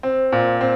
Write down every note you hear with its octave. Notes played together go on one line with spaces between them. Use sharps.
C4
A#2
C4